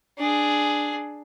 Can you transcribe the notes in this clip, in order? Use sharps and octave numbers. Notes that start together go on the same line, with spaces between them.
D4 G#4